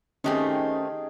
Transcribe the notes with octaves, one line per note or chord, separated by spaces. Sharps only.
D#3 A3 C4 C#4 D#4 G4 G#4